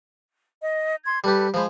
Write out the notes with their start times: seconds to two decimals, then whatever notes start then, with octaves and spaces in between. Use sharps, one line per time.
0.61 D#5
1.05 C6 G#6
1.24 G3 G4 A4 B4
1.54 F3 G#3 C5 B5